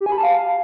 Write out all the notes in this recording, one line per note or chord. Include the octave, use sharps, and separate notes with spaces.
G4
G#5
B5
A5
F5